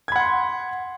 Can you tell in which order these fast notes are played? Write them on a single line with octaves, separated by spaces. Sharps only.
G#6 B5 F#5 C6